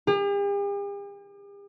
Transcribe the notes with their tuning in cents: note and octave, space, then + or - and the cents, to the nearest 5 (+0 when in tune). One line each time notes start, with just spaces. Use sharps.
G4 +45